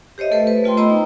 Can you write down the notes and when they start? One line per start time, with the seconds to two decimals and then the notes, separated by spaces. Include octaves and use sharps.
0.18 G4 C5 C#5 D#5 E5
0.31 A3 A4 B4 C5
0.47 B4
0.64 A3 F4 G5 C6
0.77 B3 C5 D#5 G5 A#5 E6
0.90 D#4